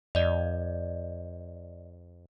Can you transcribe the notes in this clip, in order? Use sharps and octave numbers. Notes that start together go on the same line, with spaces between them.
F2 D5 D#5